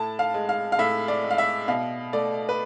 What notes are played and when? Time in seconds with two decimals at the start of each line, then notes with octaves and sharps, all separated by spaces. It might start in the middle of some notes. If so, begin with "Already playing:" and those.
Already playing: A2 A5
0.19 F5
0.34 G#3
0.49 F5
0.72 F5
0.79 A2 E5
1.08 D5
1.23 G#3
1.30 F5
1.38 E5
1.68 B2 F5
2.13 A3 D5
2.49 B4